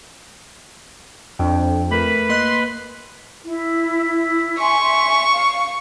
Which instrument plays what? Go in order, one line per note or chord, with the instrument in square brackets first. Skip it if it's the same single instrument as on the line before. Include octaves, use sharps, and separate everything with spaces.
[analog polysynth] F2 [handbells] D4 G5
[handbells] A3 A#4 [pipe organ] B4 B5
[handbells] A#3 D#5 F#6 [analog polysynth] C6
[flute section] E4
[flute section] E5 G#5 C6 [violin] C#6
[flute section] F5